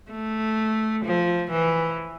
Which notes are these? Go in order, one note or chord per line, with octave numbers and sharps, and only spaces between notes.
A3
F3
E3